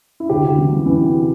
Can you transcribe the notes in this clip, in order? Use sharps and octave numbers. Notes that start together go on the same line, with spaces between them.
E4
D2 G4
D2
E3
E3
E3
C3